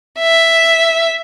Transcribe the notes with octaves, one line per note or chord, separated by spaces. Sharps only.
E5